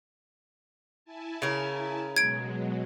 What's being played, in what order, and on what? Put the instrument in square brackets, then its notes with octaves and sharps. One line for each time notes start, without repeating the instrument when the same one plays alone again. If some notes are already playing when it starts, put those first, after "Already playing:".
[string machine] E4 G#5 A5
[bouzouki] C#3 A#4
[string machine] B2 F#3 G#3 [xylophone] G#6 D7